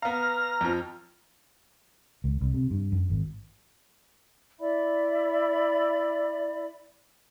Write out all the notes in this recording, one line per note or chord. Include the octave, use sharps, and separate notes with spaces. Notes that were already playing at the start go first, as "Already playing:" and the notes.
B3 F5 A#5 F6
F2 F3
C#2
C2
C3
G2
F#2
G#1
E4 D5 E5 B5